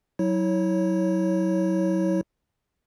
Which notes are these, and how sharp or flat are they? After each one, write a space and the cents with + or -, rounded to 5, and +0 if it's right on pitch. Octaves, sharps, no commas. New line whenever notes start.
F#3 +5 E4 -25 C#5 -5